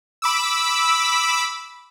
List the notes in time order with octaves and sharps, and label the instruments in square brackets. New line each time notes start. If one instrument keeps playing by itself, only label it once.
[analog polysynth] B5 D6 E6